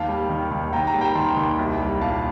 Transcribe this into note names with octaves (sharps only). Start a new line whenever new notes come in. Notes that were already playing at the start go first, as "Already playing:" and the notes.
Already playing: D#2 F5 A5
G3
D#3
D#2
D#2 G5 A#5
G5 A#5
G3
G5 A#5
D#3 A5 C6
D#2
C2
G3
A#2 F5 A5